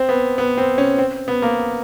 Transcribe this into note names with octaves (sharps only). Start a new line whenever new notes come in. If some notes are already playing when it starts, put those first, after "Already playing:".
Already playing: C4
B3
B3
C4
C#4
C4
B3
A#3